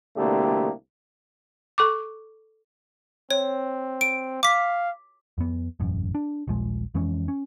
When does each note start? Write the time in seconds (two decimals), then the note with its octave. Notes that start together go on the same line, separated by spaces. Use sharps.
0.17 C2 B2 D3 A3 A#3 G4
1.78 A4 C#6 D6
3.31 C4 C#5
4.01 D7
4.43 F5 D6 B6
5.38 F2 B3
5.80 E1 A1 F#2
6.15 D4
6.48 D#1 A#1 F3 G#3
6.94 F2 E3 G#3 C#4
7.28 C#4